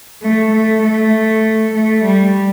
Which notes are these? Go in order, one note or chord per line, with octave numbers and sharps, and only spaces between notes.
A3
A3
A3
A3
G3